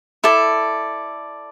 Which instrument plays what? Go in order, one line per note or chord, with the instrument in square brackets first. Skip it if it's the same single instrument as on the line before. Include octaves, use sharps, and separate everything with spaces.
[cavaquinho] E4 A4 D5